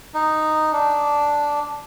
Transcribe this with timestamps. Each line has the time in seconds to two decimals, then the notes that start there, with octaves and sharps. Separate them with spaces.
0.14 D#4
0.73 D4